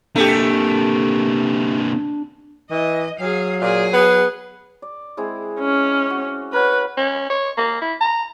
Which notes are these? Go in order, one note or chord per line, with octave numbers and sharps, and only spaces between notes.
C3 A3 A#3 D4 G4
E3 D#5
F#3 G#4 F5
A#2 G#4
B3
D5
G#3 C4 E4
C#4
F#4
A#4 B4 C#5 F#5
C#4
C#5
A#3
E4
A#5